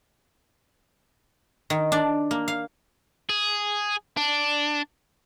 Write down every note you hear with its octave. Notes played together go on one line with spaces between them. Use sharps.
D#3
D4 D5
A#3
F5
G#4
D4